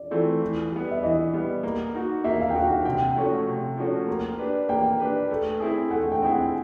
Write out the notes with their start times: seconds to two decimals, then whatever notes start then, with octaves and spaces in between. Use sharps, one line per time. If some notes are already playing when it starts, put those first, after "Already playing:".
Already playing: D5
0.11 E3 A3 C4 F4
0.42 E3
0.71 G3 B3
0.91 E5
1.03 E3 D#5
1.33 G3 B3
1.63 A#3
1.94 D#4 F#4
2.24 A#3 E5
2.40 F5
2.50 G5
2.55 D#4 F#4 F#5
2.70 F#5
2.85 C3 G5
3.16 F3 A3 C#4 F#4
3.47 C3
3.77 F3 A3 C#4 F#4
4.07 A#3
4.38 D4 G4 B4
4.69 A#3 G5
5.00 D4 G4 B4
5.30 A3
5.60 C4 E4 G#4
5.91 A3 F#5
6.12 G5
6.22 C4 E4 G#4
6.31 F#5